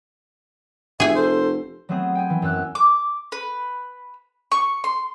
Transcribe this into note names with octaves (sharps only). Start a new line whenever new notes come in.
F1 G#4 E5 G#5
A4 C5
F#3 A3 B3 C4 G#4
G5 G#5
E3
F#2 A#3 E6 F#6
D6
B4
C#6
C6